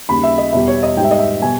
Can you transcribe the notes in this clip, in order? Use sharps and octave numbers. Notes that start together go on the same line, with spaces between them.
D#2 C#3 G3 B5
E5
D#5
E2 B2 G3 E5
C#5
D#5
G#2 G3 E5 G5
D#5
E5
B2 G3 G#5